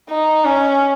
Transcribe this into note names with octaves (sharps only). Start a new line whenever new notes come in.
D#4
C#4